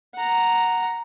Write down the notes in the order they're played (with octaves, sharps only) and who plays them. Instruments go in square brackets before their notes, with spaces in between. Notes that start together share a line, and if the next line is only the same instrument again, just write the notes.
[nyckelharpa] F#5 A#5